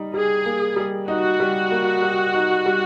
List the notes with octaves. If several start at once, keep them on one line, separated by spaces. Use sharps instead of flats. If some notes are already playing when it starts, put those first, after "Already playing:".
Already playing: G3 D#4
G3 G#4
A#3
G3
D#4 F#4
G3
A#3
G3
D#4
G3